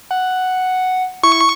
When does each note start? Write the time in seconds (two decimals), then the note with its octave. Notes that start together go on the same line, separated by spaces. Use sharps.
0.11 F#5
1.24 E4 C#6